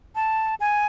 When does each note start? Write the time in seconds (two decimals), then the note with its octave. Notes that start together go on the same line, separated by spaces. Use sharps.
0.15 A5
0.60 G#5